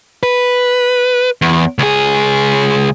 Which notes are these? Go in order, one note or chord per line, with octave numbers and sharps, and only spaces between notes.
B4
E2
C#2 G#4